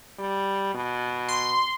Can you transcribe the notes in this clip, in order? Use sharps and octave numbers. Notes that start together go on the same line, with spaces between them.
G3
B2
C6